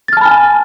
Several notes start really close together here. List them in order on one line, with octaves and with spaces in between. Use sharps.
A6 F6 A5 B5 G#5